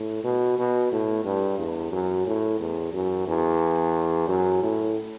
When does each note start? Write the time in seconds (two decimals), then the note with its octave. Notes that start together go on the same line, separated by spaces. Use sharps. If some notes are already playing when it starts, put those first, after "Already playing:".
Already playing: A2
0.24 B2
0.58 B2
0.92 A2
1.24 G2
1.59 E2
1.92 F#2
2.27 A2
2.60 E2
2.93 F#2
3.27 E2
4.28 F#2
4.63 A2